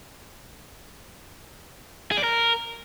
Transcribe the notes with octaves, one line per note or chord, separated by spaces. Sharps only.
G#4
D5
A#4